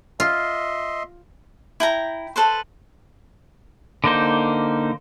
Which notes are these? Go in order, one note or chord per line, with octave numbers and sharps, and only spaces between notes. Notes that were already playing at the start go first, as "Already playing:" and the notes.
F4 D#5 E5 C6
E4 G5 A#5
A4 B4 C5
D3 A#3 D#4 C5